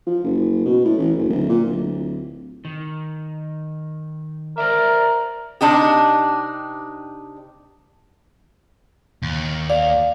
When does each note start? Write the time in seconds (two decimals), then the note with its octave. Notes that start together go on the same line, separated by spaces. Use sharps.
0.07 F3
0.24 F#1
0.65 B2
0.85 A2
0.99 A1
1.18 F#1
1.30 D1
1.49 A#2
1.65 D1
2.65 D#3
4.58 A#4 C5 D5 E5
5.61 C3 D4 D#4 G4
9.23 D#2
9.70 D5 F5